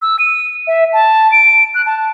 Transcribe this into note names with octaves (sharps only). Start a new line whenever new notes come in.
E6
D#7
E5
A5
D7
F#6
A5